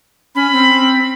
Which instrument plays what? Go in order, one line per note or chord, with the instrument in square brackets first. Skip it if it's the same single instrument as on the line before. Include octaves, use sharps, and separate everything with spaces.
[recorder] C#4 [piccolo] B5
[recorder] C4